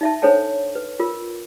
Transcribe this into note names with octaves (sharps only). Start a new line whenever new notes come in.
D#4 E5 A5
D4 A4 C5 C#5 G5 A5
B4
F4 A#4